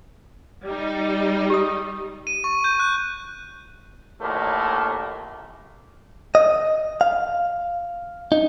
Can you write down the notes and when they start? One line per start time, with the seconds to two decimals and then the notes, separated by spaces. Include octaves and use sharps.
0.66 G3 D#4
1.50 G4 D#6
2.27 D#7
2.44 C#6
2.64 G6
2.80 F#6
4.21 A#1 D#2 A2 A3 A#3
6.35 D#5
7.01 F5
8.32 D#4